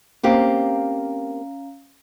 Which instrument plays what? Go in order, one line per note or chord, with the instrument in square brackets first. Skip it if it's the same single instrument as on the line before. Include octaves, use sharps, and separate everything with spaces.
[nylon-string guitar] A#3 C4 G4 [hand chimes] C#4 F5 A#5